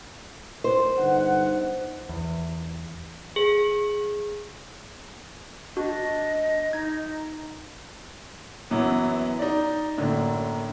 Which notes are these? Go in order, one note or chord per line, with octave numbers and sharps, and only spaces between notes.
C5
G1 D#4 F#5
E2
G#4
D4 F#4 D#5
D#4 G#6
F#2 E3 F#3 B3
D#4 D5
F#2 A2 D3 A#3